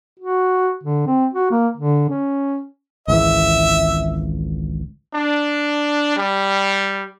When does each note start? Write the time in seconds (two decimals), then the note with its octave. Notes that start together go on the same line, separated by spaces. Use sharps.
0.20 F#4
0.84 D3
1.07 C4
1.34 F#4
1.51 A#3
1.77 D3
2.10 C#4
3.08 G#1 C#2 E3 E5
5.13 D4
6.17 G3